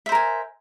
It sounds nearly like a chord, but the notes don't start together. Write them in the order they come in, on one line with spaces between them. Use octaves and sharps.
E5 C5 A#4 G#5